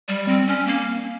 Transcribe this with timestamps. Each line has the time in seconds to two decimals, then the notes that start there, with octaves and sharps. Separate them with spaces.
0.09 G3
0.28 C4
0.47 C#4
0.67 A#3